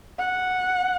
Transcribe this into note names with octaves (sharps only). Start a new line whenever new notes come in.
F#5